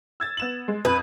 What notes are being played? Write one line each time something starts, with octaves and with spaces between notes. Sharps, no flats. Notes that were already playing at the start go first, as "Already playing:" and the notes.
E6 G#6 A6
B3 E7 F#7
G#3
F2 B4